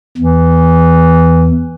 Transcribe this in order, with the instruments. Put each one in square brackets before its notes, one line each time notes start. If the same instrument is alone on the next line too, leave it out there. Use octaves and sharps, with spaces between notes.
[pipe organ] E2 [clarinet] E3